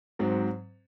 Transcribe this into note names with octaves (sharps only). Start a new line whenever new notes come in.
G#2 F#3 C4